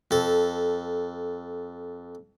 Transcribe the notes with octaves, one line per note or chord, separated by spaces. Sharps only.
F2 A4